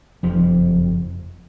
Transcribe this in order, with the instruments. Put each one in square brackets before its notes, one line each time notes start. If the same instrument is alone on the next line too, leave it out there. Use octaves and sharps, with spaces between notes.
[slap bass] F#1 F2 F3